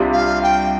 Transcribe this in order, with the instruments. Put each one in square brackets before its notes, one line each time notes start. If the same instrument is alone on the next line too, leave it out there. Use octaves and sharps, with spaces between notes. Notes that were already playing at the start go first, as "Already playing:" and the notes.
Already playing: [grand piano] C2 C3 G3 D4 F4
[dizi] F5
G5